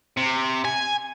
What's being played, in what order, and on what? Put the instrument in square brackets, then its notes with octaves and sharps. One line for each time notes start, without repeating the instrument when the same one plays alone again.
[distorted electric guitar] C3
G#5